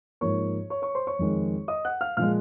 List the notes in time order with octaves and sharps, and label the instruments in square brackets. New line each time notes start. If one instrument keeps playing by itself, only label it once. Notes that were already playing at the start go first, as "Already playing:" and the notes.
[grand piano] G#2 F3 A#3 C#5 C#6
C#5 C#6
C#5 C#6
C5 C6
C#5 C#6
F2 D#3 G#3
D#5 D#6
F#5 F#6
F5 F6
A#2 F3 G#3 F5 F6